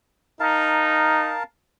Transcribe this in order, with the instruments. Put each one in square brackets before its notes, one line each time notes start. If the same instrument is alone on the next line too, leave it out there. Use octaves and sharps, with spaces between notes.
[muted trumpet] D#4 [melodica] A#4 F5 A5